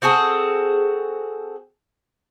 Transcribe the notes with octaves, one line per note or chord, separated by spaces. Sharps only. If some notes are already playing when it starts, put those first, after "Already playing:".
C4 F#4 G#4 A4